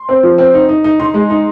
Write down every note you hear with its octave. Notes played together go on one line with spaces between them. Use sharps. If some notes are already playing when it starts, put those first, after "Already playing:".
Already playing: C6
C4
F3
C4
D#4
D#4
D#4
D#4 C6
G#3
D#4